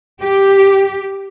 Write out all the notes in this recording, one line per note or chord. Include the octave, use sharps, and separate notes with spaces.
G4